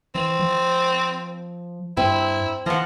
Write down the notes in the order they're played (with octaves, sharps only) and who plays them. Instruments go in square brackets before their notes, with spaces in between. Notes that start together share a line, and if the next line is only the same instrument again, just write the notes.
[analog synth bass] E3 [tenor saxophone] C4
[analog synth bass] F3
[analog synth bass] G2 [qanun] C4 [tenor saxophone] E4
[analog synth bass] E3 [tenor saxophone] F3 [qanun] F#5 A#5